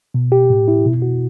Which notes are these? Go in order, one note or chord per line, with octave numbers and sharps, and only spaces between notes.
B2
G4
A2
E4
B2
F#4